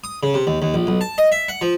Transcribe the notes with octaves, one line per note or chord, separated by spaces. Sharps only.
D#6
C#3
C3
D#2
D#2
A#1
B1
A5
D#5
E5
F#5
F3